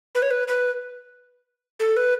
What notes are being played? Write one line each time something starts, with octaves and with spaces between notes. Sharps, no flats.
B4
C#5
B4
B4
A4
B4